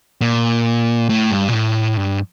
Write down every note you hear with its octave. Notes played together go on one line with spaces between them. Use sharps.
A#2
A2
G2
A#2
A2
G2